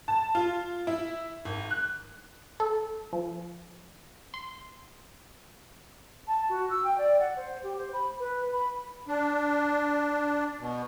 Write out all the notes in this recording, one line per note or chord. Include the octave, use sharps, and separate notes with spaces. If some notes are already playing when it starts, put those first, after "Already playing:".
A5
F4
E4
G#1
F#6
A4
F3
C6
A5
F#4
E6
G5
D5
F#5
C5
G4
C5
B5
B4
B5
D4
B2